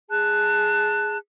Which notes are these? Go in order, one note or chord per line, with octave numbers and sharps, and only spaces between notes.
G#4 A5 F#6